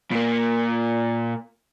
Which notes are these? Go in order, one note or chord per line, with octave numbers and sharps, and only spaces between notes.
A#2 A#3